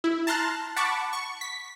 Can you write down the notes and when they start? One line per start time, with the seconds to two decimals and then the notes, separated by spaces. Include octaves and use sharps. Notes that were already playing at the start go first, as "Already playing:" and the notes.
0.04 E4
0.27 A5 A#5 C6 F6 F#6
0.76 F#5 A5 B5 C#6 D6
1.13 C#6
1.41 B6